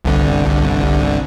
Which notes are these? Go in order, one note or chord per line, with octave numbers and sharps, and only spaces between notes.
G1 C2 D3